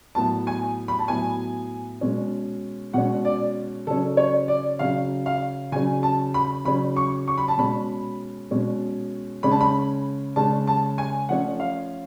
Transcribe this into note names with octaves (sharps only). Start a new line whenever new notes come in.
A2 F#3 B3 A5
G#5
B5
A5
A2 F#3 B3 G#5
B2 G#3 C#4
B2 G#3 C#4 F#5
D5
C#3 F#3 C#4 A4
C#5
D5
C#3 F#3 C#4 F5
F5
C#3 F#3 C#4 G#5
A5
B5
C#3 F#3 C#4 B5
C#6
C#6
B5
A5
B2 G#3 C#4 B5
B2 G#3 C#4
C#3 G#3 C#4 B5
A5
B5
C#3 G#3 C#4 A5
A5
G#5
F3 A3 C#4 F#5
F5